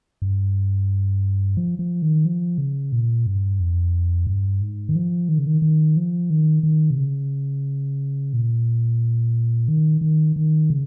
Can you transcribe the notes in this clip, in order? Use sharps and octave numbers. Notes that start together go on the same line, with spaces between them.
G2
F3
F3
D#3
F3
C#3
A#2
G2
F2
G2
G#2
D#3
F3
D#3
C#3
D#3
D#3
F3
D#3
D#3
C3
C#3
A#2
D#3
D#3
D#3
C#3